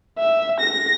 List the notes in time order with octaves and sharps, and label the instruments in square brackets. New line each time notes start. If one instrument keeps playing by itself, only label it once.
[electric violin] E5
A#6